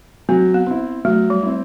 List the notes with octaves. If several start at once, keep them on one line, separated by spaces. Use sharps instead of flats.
F#3 C4
B3
C4 E4
F#3 A3
G3
C4 E4